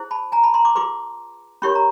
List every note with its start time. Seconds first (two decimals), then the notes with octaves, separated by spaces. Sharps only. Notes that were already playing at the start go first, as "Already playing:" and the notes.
Already playing: E4 G#4 C5
0.11 A5 B5
0.32 G#5 A#5
0.43 A5 B5
0.54 A#5 C6
0.65 C6 D6
0.75 F4 G#4 B4 C6 D6
1.62 C#4 E4 G4 A#4 C#5 B5 C#6
1.75 A#5